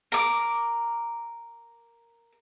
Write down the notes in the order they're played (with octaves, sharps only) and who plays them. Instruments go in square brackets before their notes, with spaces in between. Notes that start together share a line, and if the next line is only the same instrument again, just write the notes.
[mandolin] A#4 D6